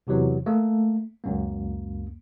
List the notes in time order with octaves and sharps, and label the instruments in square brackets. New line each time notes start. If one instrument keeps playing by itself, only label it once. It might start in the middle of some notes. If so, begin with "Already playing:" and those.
[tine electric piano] E2 C3 E3 F#3
A3 A#3
C#2 F#2 A#3